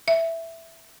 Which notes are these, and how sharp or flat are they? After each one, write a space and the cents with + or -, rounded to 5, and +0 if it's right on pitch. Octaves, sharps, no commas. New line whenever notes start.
E5 +5